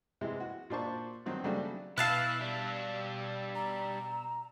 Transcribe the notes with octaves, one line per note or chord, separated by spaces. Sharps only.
C3 E3 G#3
F#4
A#2 A#3 D4 C5 A5 C#6
G2 D#3 F#3 C4 D#4
C#3 F#3 G3 A3 D4 F#4
B2 E4 B4 F5 A5 E6 F#6
G3 D4
A#5